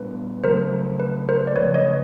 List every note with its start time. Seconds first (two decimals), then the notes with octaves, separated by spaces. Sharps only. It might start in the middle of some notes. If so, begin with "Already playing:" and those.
Already playing: A#2 G3 B3 D4 B4
0.44 C#3 F#3 A3 A#4 C5
1.00 B4
1.29 A#4 C5
1.47 D5
1.56 C#3 F3 A3 B4 C#5
1.74 C#5 D#5